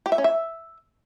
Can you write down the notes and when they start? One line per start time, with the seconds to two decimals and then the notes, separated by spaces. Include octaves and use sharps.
0.06 G4
0.12 E5
0.18 C#4
0.24 E5